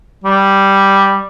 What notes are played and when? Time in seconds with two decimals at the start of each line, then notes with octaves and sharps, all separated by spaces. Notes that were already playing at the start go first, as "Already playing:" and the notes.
0.24 G3